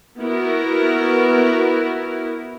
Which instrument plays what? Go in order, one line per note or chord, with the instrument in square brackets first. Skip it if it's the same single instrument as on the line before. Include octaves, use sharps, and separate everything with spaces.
[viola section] B3 E4 F#4 A#4